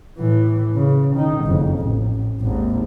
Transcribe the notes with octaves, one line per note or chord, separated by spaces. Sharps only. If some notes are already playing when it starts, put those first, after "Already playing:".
A2 E3
C#3
D#3 D#4
F#1 F2
A1
G#1 D#2